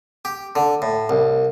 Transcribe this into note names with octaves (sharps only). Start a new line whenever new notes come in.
G4
D3
A2
C2